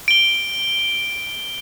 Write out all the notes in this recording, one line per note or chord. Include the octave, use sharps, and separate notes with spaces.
D7 G7